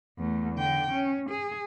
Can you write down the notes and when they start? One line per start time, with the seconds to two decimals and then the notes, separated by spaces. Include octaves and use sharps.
0.19 E2 A3
0.54 D3 G5
0.92 C#4
1.30 G#4